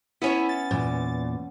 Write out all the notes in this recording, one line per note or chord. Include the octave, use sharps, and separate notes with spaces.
B3 C#4 E4 C#5
A6
E2 A#2